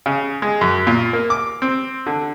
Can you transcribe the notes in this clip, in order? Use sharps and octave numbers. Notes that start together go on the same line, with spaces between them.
C#3
G#3
F#2
A#2
A#3
D6
C4
D3